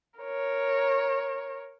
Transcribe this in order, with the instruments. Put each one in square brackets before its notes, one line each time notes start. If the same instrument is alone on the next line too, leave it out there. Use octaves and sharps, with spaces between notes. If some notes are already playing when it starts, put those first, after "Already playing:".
[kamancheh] A#4 C#5